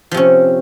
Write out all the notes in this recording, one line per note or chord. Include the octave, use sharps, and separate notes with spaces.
C3 F3 C#4